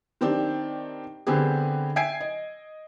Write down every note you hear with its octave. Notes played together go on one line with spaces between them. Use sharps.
D#3 C4 D4 G4
D3 B3 C4 G4 G#4
E5 G5 G#5 G#6 C7 D7
D#5